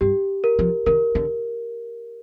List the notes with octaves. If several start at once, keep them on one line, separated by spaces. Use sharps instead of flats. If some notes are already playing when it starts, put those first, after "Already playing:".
G2 G4
A#4
F3
D#3 A#4
D3